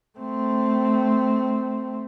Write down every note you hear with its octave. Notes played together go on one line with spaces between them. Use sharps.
A3 C4